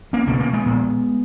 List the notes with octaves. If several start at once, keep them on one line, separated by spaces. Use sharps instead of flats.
A#3 C#4
C#2 B2 A#3 C#4
A#3 C#4
G#3 B3
A#1 A#2